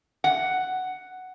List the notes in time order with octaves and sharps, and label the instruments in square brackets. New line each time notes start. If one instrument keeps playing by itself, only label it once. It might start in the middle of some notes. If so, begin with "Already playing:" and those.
[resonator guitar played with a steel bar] F#5